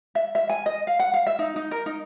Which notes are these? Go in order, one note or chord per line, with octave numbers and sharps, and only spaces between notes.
E5
E5
G#5
D#5
F5
F#5
F5
E5
D#4
D#4
A#4
D#4